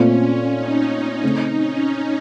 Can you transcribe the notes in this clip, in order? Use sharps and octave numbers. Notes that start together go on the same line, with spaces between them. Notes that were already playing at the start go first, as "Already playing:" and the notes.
Already playing: A#2 A3 C4 C#4 F4
C#4
D#4
C#4
C#3 A3 C4 D#4
C#4